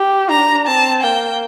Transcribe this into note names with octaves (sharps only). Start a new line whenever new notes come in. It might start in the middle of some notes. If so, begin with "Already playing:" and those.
Already playing: G4
D4 A#5
C4 A5
A#3 G5